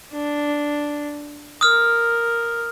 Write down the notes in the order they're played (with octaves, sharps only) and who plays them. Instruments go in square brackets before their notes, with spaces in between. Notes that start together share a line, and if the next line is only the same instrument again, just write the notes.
[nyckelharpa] D4
[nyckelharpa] A#4 [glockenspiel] D#6 F6